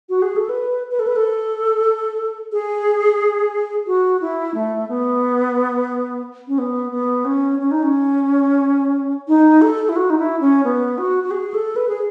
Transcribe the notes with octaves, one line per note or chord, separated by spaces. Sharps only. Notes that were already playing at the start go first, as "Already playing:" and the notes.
F#4
G#4
A4
B4
B4
A4
B4
A4
G#4
F#4
E4
A3
B3
C#4
B3
B3
C#4
C#4
D#4
C#4
D#4
A4
E4
F#4
D#4
E4
C#4
B3
F#4
F#4
G#4
A4
B4
G#4